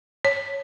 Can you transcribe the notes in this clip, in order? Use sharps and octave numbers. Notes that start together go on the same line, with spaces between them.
C#5